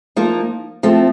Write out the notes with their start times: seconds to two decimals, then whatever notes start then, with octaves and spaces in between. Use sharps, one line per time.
0.16 F3 A#3 D#4
0.83 F3 A3 C4